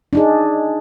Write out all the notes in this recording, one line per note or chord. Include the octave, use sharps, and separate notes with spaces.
D4 D#4 G#4